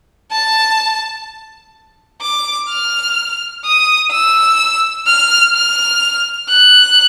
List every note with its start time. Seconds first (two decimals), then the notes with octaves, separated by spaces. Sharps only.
0.32 A5
2.22 D6
2.69 F6
3.64 D#6
4.12 E6
5.07 F6
5.54 F6
6.49 F#6